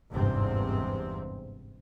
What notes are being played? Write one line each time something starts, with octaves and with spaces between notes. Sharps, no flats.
G1 E2 G#2 C3 C4